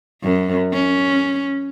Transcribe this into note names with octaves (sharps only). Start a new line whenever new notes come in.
F#2
C#4